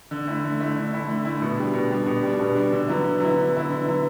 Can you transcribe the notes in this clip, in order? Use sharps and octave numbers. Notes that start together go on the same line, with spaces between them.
D3
A3 E4
D3
A3 E4
D3
A3 E4
D3
A3 E4
B2
G3 D4
B2
G3 D4
B2
G3 D4
B2
G3 D4
D3
F#3 B3 E4
D3
F#3 B3 E4
D3
F#3 B3 E4
D3
F#3 B3 E4